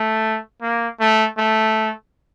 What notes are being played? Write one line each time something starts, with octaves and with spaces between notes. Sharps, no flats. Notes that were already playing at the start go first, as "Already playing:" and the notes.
Already playing: A3
A#3
A3
A3